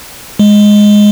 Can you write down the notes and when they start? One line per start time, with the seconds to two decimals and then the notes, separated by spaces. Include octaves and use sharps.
0.39 G#3